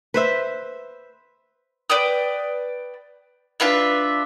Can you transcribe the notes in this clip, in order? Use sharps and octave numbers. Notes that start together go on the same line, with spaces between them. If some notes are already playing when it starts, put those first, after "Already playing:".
B4 C5 E5
B4 D5 G5 D#6
D4 F4 B4 E5